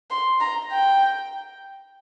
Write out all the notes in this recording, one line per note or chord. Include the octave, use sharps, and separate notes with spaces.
C6
A#5
G5